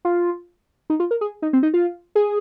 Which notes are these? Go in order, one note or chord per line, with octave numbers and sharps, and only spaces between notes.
F4
D#4
F4
A#4
G#4
D#4
C4
D#4
F4
G#4